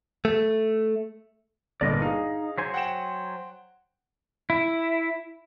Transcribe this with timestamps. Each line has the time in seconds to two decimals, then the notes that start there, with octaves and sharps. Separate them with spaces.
0.25 A3
1.81 G1 G2 A#2 D5 D#5
2.02 D#4 G#4 F5
2.58 F#3 C5 G#5
2.74 F#5 G5 E7
4.50 E4